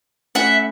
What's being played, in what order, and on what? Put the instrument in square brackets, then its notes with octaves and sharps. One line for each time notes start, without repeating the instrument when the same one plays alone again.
[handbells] A3 C#4 E4 [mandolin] E5 F#5